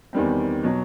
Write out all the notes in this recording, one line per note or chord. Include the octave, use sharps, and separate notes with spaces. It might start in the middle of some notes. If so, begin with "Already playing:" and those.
E2 D#3 G3 C4
B2 F#3